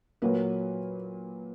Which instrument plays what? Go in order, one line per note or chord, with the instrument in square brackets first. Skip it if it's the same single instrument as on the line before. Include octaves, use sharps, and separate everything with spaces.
[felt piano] A#2 F#3 A#3 B4